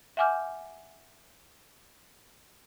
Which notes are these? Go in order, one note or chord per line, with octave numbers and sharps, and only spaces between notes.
E5 F#5 G#5 D6 F6 G6